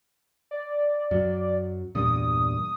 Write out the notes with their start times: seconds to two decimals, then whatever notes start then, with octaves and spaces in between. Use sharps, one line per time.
0.51 D5
1.11 F#2 F#3
1.95 E2 G2 A#2 D#6